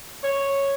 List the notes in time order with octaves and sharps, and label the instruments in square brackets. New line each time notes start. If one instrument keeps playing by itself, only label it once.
[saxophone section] C#5